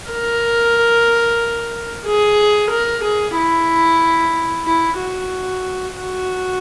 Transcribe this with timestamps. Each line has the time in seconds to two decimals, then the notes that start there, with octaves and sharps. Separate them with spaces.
0.10 A#4
2.06 G#4
2.71 A#4
3.04 G#4
3.36 E4
4.66 E4
4.99 F#4
5.96 F#4